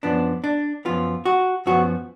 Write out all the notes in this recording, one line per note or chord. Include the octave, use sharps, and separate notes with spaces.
F#2 F3 B3 D4
D4
F#2 F3 B3 F4
F#4
F#2 F3 B3 F#4